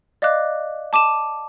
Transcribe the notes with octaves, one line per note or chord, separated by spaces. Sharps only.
D5 D#5 F5 D6 F#6
A5 D6 D#7 E7